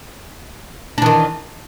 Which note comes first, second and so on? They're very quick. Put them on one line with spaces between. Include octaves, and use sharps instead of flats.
D4 E3 D#3